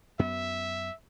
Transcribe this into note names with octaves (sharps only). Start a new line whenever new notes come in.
F#2 B3 E5